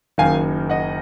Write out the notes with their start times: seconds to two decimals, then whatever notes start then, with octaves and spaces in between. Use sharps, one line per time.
0.18 F#1 F#2 D#3 F5 G#5
0.70 D#5 F#5